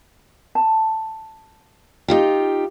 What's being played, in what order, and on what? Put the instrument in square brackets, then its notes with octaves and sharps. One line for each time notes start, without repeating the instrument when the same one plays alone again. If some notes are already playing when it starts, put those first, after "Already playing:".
[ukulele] A5
[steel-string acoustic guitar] D#4 F4 G4